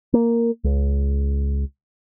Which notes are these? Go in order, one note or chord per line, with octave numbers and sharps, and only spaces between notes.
A#3
C#2